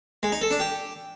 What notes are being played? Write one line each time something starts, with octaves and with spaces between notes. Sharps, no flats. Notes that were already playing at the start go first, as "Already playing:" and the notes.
G#3
D#4
A4
D4
G4